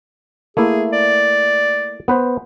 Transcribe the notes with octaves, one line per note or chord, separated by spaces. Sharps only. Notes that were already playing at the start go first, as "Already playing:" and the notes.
A3 A#3 E4 G#4
D5
B3 B4 C5